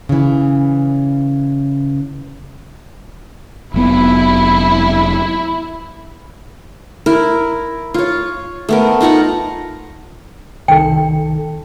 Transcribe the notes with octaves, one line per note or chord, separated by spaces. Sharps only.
C#3 E3
F1 F#3 B3 E4
E4 A#4
F4 C#5
A3 B3 A#4
D#4 F4 F#5 A#5
C2 D#3 A4 G5